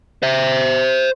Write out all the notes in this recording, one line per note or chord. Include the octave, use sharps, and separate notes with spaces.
C5 E5